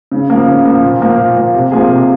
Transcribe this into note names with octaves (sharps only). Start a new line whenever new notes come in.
C#3
F3 A#3
C#3
F3 A#3
A#2
F3 A#3
A#2
F3 A#3
C3
F3 A#3 F4 G#4
C3